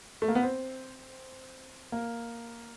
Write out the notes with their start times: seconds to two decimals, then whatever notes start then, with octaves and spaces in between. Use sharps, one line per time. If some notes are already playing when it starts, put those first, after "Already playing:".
0.22 A3
0.28 A#3
0.35 B3
0.43 C4
1.92 A#3